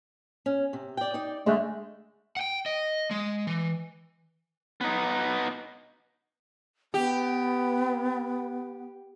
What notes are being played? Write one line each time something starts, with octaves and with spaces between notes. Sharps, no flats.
C#4
C3
D5 G5
D#4 D5
D3 G#3 A3
F#5 G5
D#5
G#3
E3
B3 D#4
B3 G4